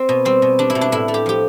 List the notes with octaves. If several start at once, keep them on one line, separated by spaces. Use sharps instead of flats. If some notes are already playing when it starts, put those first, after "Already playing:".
Already playing: C4
B2
G3 C4
B2
G3 D4
E4
B2
D4
A2 E4
A3
G4
F3 G4